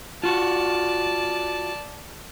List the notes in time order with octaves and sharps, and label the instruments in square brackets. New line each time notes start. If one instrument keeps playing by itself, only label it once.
[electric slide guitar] F4 F#4 [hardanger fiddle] D5 A5